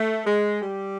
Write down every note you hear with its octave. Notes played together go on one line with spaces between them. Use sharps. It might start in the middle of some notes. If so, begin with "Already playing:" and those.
Already playing: A3
G#3
G3